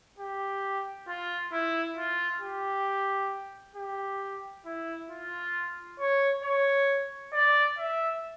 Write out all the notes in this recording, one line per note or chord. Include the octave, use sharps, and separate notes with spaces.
G4
F4
E4
F4
G4
G4
E4
F4
C#5
C#5
D5
E5